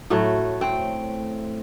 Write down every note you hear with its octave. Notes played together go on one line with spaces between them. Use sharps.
A2 F#3 A3
C4